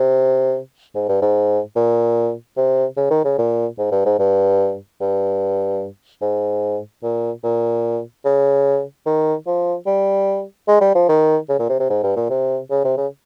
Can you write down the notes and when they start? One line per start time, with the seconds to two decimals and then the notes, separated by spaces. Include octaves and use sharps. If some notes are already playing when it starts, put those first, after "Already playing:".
Already playing: C3
0.95 G#2
1.09 G2
1.22 G#2
1.76 A#2
2.57 C3
2.97 C#3
3.11 D#3
3.25 C#3
3.38 A#2
3.78 G#2
3.92 G2
4.06 G#2
4.19 G2
5.01 G2
6.22 G#2
7.03 A#2
7.43 A#2
8.25 C#3
9.06 D#3
9.47 F3
9.86 G3
10.68 G#3
10.81 G3
10.95 F3
11.09 D#3
11.49 C#3
11.59 A#2
11.69 C3
11.80 C3
11.90 G#2
12.03 G2
12.16 A#2
12.30 C3
12.71 C#3
12.85 C3
12.97 C#3